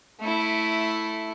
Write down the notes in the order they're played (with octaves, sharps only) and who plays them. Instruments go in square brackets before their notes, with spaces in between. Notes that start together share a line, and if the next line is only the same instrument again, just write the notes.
[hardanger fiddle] A3 E4